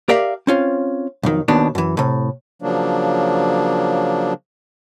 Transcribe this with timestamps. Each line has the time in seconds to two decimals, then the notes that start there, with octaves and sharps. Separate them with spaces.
0.09 G4 A#4 D5 E5 F5
0.47 C4 C#4 F4
1.23 B1 F2 D#3
1.48 D#2 B2 D#3 B3 D4
1.75 F#2 E3
1.97 A2 C3
2.62 C#3 F3 F#3 A#3 D4